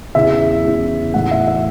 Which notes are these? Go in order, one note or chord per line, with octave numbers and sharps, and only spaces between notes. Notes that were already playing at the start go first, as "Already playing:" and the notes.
E2 C#3 E3 E5
E2 C#3 E3
A2 E3 F#5
E5
E5